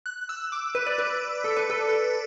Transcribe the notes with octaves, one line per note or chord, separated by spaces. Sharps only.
F#6
E6
D6
B4
D5
B4
A4
B4
A4